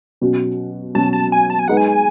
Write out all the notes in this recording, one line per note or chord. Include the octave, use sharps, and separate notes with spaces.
B2 F#3 C#4 F#4
B2 F#3 C#4 F#4 A5
A5
G#5
A5
G#5
G#3 D#4 G#4 B4 F#5
G#5